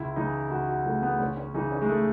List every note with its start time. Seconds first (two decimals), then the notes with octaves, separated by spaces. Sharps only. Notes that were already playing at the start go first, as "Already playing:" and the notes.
Already playing: C#2 E4
0.16 C#3 E3 D#4
0.50 C#2 F#4
0.68 F#4
0.85 C#3 E3 A3
1.03 B3
1.19 C#2 C#4
1.37 C#4
1.54 C#3 E3 D#4
1.72 C#4
1.82 G#3
1.89 A3